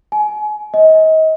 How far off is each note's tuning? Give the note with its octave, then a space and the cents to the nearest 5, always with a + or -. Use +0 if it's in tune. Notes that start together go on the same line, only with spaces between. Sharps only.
G#5 +30
D#5 +30